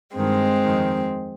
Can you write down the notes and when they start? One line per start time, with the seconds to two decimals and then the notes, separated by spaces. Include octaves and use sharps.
0.15 G2 D#3 G#3 C4
0.63 F2 D#3